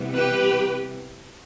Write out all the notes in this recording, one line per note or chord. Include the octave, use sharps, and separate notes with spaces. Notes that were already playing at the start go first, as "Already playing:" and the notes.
Already playing: C3 E3 G3 B3
G4 B4